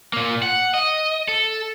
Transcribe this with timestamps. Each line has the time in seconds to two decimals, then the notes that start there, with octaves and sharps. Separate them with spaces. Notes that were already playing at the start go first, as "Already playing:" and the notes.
0.13 A#2 A#3
0.43 F#5
0.74 D#5
1.28 A4